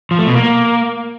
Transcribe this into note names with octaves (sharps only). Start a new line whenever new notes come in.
F3
A3
B2
A#3